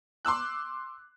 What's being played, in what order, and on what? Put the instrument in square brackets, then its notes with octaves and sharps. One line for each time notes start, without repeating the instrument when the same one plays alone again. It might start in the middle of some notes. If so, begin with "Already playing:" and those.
[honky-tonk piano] C6 D6 E6 F#6